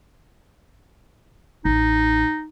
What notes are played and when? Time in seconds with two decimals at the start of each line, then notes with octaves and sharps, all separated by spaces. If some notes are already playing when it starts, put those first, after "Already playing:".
1.65 A1 D#4